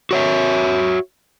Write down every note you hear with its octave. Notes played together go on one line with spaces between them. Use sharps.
F#4 C#5 E5